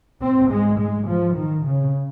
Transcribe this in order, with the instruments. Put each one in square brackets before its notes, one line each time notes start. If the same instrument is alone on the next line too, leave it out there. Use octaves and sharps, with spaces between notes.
[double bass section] G#2 C4
G#3
G#3
F3
D#3
C#3